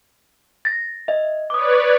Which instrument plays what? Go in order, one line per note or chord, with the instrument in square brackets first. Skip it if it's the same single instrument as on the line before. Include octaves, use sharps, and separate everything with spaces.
[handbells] A6 A#6
D#5 E5
[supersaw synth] B4 C#5 D5 [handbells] D6 D#6